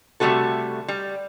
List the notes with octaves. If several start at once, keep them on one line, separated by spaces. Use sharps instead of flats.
C3 G3 A3 B3 F#4 A4
G3